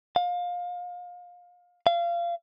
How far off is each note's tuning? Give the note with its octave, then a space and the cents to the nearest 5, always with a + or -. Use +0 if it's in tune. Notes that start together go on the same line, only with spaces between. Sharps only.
F5 +25
F5 -25